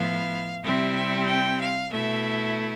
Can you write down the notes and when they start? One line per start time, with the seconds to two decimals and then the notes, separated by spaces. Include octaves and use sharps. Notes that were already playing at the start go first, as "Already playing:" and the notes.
Already playing: A2 F3 B3 E4 F5
0.63 C3 G3 C4 E4 E5
0.95 E5
1.26 G5
1.58 F5
1.90 B2 A3 E4 E5